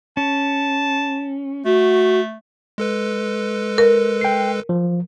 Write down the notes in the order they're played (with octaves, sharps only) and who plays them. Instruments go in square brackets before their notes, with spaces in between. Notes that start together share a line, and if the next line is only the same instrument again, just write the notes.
[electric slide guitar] C#4 [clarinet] A5
[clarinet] A3 [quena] F#4
[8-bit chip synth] G#3 A4 B4
[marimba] A#4
[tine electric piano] G5 C7
F3